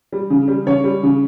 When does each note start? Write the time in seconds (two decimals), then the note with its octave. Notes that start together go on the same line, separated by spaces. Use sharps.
0.12 G3
0.30 C#3
0.48 G3
0.66 C#3 C#5
0.84 G3
1.03 C#3